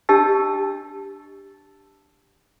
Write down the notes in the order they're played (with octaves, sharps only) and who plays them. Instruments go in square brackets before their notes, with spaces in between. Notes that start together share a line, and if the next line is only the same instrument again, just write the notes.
[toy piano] D4 G4 D#5 A5 E6